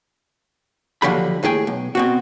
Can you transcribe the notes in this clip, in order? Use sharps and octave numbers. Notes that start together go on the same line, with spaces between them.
D#2 D3 F3 F#3 G4 B5
D#2 A2 G#4 G5
B1
B2 C4 F#4